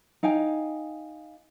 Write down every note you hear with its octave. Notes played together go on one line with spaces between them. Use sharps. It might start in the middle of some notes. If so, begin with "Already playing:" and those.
D#4 F5 G5 G#5